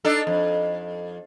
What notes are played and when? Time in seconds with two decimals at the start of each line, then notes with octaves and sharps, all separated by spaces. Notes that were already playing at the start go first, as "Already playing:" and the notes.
0.05 D4 D#4 A4
0.27 F2